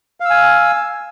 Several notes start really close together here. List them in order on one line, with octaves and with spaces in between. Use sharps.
F5 E6 G#5